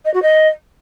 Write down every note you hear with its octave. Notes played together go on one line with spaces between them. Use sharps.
D#5
F#4
D#5